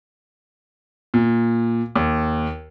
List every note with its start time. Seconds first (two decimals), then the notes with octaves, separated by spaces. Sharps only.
1.14 A#2
1.96 D#2